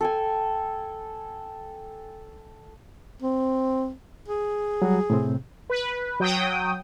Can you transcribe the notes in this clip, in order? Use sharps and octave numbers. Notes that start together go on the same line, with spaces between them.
A4 G5 G#5
C4
G#4
F#3 G3 F#4
A2 C3 C4
B4
F#3 G5 D#6